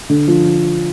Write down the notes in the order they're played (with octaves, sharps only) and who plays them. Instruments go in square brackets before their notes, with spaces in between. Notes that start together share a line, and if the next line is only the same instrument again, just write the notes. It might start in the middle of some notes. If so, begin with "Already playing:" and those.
[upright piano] D3
F3